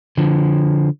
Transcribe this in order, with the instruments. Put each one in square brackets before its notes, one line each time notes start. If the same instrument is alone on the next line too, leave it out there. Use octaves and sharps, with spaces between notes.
[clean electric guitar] D3 F3